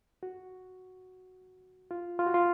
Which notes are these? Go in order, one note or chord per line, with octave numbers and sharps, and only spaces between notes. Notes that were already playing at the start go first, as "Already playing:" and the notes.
F#4
F4
F4
F#4
F4